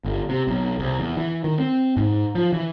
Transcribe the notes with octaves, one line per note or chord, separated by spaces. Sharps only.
G1
C3
B1
C2
E2
E3
D#3
C4
G#2
F3
E3